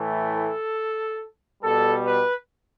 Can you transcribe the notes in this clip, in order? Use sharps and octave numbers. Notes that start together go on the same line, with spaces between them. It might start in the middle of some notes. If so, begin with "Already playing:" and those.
Already playing: A2 E3 A3
A4
B2 G3 A4
B4